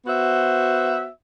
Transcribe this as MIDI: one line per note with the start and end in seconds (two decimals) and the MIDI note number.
0.06 1.08 59
0.06 1.08 66
0.06 1.08 72
0.06 1.08 76